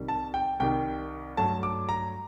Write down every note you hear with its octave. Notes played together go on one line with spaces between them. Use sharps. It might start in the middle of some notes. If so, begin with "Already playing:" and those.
Already playing: C2 C3 D#3 G3
A5
G5
C2 C3 D#3 G3 G5
G2 F#3 A3 A5
D6
A#5